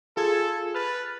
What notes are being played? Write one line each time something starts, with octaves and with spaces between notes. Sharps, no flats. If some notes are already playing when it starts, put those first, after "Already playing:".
F4 G#4 A4 G#6
B4 F6 A6